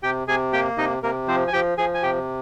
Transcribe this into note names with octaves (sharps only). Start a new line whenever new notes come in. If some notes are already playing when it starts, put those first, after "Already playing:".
C3 G4 G5
C3 G#4 G#5
A#3 G4 G5
C3 D#4 D#5
C3 A#3 A#4
F3 C4 C5
G#5
F3 G4 G5
F3 G#4 G#5
G#5
C3 G4 G5